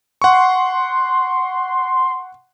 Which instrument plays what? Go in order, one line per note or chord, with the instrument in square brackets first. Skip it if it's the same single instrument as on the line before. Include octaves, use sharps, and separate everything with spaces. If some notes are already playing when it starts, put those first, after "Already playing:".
[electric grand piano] F#5 C#6 [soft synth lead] C6